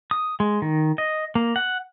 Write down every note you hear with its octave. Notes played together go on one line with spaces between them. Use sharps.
D#6
G#3
D#3
D#5
A#3
F#5